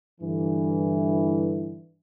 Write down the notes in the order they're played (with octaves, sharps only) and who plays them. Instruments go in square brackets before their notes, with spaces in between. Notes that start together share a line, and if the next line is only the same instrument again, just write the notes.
[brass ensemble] G2 D3 E3